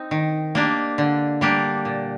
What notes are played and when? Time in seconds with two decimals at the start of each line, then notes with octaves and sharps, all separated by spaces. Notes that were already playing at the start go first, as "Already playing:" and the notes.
Already playing: C4 D#4
0.11 D#3
0.55 A#3 D4 G4
0.98 D3
1.41 G3 A#3 D4 G4
1.85 A#2